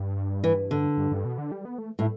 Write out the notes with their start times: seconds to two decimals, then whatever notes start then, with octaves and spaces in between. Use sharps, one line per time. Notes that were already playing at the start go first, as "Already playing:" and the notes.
Already playing: G2
0.44 E3
0.71 D3
0.98 G2
1.12 G2
1.25 B2
1.38 D3
1.52 G3
1.65 B3
1.78 A3
1.99 A2 E4